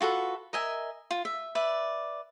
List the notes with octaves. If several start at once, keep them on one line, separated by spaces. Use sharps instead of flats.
F4 F#4 A4 B4
A#4 D#5 E5 G#5
F4
E5
B4 D5 E5